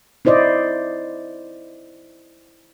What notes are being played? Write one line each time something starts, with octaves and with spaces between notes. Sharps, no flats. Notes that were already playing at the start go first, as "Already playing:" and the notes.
D#4 E4 C5 D5 D#5